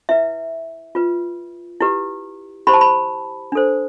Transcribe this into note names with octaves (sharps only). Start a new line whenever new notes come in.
E4 B4 E5
F4 B4
E4 G4 B4
E4 G4 C5 B5
A5
B5
D4 A4 C5